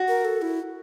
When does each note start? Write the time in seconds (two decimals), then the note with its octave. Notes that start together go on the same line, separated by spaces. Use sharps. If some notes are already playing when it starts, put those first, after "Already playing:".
Already playing: F#4
0.08 A#4
0.25 A4
0.42 E4